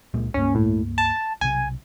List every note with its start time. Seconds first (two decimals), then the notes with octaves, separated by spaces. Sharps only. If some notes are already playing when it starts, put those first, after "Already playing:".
0.14 C#2 A#2 G#3
0.34 C#2 G2 A#3 C#4
0.55 A2
0.98 A5
1.41 B1 C3 G#5